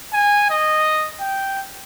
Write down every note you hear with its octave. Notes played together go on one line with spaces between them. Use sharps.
G#5
D#5
G5